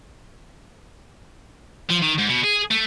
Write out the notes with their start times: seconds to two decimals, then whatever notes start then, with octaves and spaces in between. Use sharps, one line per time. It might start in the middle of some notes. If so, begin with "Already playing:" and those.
1.90 F3
2.02 D#3
2.18 G#2
2.29 B2
2.44 G#4
2.71 A3